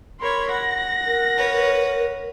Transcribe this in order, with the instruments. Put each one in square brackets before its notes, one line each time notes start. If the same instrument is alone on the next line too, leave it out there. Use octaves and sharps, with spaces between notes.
[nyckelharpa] A#4 C#5 [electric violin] B5 C6
[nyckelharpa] F#5 [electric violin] A#6
[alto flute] A#4
[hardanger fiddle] B4 C#5